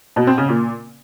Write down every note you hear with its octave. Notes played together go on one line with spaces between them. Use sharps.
B2
C4
C#3
A#2